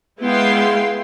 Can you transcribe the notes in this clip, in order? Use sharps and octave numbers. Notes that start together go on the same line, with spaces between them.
G#3 B3 E4 F5 G5 C6